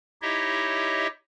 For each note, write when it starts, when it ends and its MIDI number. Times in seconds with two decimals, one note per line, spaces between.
0.22 1.07 63
0.22 1.07 64
0.22 1.07 67
0.22 1.07 73
0.22 1.07 75
0.22 1.07 76